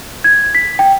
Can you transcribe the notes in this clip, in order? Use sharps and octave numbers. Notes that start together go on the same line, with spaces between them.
G#6
B6
G5